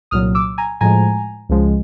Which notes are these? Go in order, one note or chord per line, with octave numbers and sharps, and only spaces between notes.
C2 A#2 F#3 D#6 F6
D6 E6
G#5 A#5
A2 F3 G#3 G#5 A#5
C#2 C#3 F3 G#3